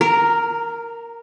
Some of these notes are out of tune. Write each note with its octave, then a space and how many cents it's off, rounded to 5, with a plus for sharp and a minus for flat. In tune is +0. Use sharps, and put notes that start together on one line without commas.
A#4 +0 A#5 -30